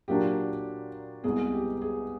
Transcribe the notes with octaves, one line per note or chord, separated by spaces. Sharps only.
A#2 F#3 A#3 D4 G4
C2 B2 G#3 G#4
G4
G#4